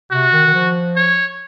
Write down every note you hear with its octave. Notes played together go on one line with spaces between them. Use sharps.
C3 F#4
D#3
D#3
F3
C#5